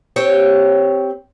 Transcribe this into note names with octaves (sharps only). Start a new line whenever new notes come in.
C4 G4 C#5